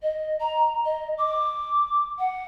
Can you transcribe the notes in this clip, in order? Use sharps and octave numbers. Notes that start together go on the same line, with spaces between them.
D#5
A#5
D#5
D6
F#5